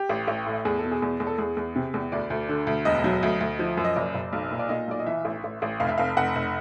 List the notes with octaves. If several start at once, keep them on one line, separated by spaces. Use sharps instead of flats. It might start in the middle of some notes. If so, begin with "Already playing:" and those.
Already playing: G4
A1
A1
A2
E2 G#4
B2 A4
G#4
E2
E2
A4
E2 G#4
E2
C3
E2
D2 D5
D2
D3
D2
E1 D#5
F#3
D2
D2
F3
F#2
D#5
F#1 D5
F#1
B1
A#2
D5
A#2 D#5
B1 D5
D#5
E3 E5
A1
A1
A1
F1 F5
E5
F1 F5
F1 F#5
F1